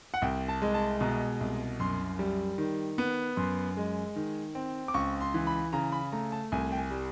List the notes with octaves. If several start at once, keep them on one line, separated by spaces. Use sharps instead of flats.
F#5
C2 G5
A5
G#3
A5
B2 A#5
C2
F#2 C6
G3
D#3
B3
F#2 C6
G#3
D#3
C4
D6
C#2 C#6
C6
E3
B5
C#3 A#5
B5
A3 A#5
A5
C2 G#5
G5
G#5
G3